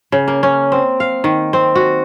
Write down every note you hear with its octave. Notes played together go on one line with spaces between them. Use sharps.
C#3
A#3
C#4
C4
F5
D#3
C4
F#4